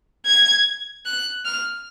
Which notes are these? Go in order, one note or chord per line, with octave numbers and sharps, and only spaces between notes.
G#6
F#6
F6